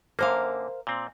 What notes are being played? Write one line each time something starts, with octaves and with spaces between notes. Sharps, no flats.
F#2 D3 A#3 A#4 C5 F5
A#2 C4